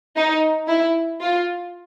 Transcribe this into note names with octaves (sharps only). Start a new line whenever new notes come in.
D#4
E4
F4